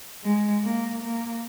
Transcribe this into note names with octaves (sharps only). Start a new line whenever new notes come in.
G#3
A#3
A#3